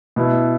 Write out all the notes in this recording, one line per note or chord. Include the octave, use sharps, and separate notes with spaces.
B2 B3 E4